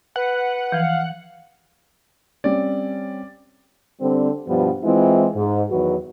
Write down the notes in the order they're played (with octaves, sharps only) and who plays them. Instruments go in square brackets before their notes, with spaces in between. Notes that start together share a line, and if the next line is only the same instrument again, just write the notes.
[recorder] B4 [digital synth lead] F#5
[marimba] E3 F3 [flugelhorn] F5
[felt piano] G3 C4 C#4 [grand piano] D5
[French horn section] D3 G3 C4
G2 B2 F3 G3 B3
E3 G#3 C4 E4 F4
G#2
E2 D#3 F#3 F#4 B4